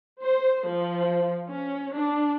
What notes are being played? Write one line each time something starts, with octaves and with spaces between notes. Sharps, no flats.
C5
F3
C#4
D4